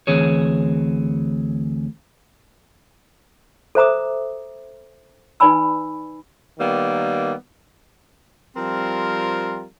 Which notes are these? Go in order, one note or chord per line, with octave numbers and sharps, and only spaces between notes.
D2 E3 C4 G#4 C#5
A4 C5 E5 A#5 D6 D#6
D#4 B4 D5 G#5 B5 E6
D#3 G3 A#3 B3
F3 G3 C4 F4 A#4